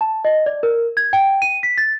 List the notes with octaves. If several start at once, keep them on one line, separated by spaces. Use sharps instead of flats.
A5
D#5
D5
A#4
G#6
G5
D#7
B6
A6